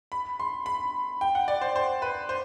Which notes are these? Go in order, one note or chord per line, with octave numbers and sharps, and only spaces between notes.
B5
C6
B5
G5
F#5
D5
C5
C5
B4
C5